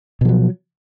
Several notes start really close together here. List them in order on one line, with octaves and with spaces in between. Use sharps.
B2 F3 F#3